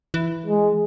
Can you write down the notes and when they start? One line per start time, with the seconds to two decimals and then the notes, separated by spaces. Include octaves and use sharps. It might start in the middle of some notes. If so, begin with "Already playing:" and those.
0.14 E3
0.46 G#3